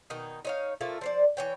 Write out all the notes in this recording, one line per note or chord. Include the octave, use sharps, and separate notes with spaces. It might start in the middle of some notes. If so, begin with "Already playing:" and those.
B2 D#3 D#4
D#4 C#5 F5
F3 A3 A#3 F4
F3 C5 D5
E3 C#5 G5